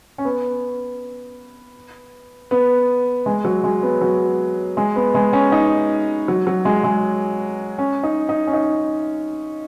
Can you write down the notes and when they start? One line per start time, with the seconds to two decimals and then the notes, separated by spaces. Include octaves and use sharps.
0.18 C#4
0.25 B3
2.51 B3
3.26 G#3
3.45 F#3
3.64 G#3
3.83 B3
4.01 F#3
4.77 G#3
4.96 B3
5.14 G#3
5.33 C#4
5.52 D#4
6.28 F#3
6.47 F#3
6.65 G#3
6.84 G#3
7.78 C#4
8.03 D#4
8.29 D#4
8.47 C#4
8.53 D#4